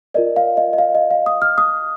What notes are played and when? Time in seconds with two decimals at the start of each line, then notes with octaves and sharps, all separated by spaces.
0.14 F4 A#4 D5 D#5
0.36 F5
0.57 D#5
0.73 D#5
0.78 F5
0.95 D#5
1.11 F5
1.26 D#6
1.42 F6
1.58 D#6